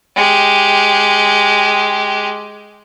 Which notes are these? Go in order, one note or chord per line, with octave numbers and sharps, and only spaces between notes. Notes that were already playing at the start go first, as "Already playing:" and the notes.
G#3 G4